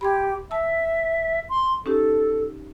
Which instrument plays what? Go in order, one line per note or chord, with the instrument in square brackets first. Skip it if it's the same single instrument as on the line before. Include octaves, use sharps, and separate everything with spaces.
[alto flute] G4 [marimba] B5 C6 G#6
[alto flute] E5 [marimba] A5 E6
[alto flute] C6
[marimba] C#4 D#4 G4 [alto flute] A4